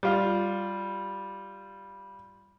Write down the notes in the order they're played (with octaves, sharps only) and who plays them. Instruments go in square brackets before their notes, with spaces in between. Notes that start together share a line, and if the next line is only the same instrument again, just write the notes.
[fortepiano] G3 F4